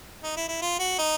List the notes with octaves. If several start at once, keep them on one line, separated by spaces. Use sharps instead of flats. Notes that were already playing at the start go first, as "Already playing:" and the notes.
D#4
E4
E4
F4
F#4
D#4